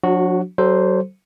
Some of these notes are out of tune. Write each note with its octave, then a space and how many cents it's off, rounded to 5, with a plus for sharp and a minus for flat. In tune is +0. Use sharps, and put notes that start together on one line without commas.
F#3 -40 D4 +0 F#4 +0
F#3 +35 A4 +0 C5 +0